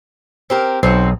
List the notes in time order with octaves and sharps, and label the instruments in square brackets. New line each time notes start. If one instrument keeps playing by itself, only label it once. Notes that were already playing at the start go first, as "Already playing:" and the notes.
[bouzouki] C4 G4 A#4
[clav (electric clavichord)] B1 [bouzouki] C4 D#4 F#4